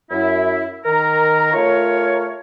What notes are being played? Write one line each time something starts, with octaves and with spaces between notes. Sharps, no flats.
F#2 E4
D#3 A#4 A#5
A3 F4 A#4 C#5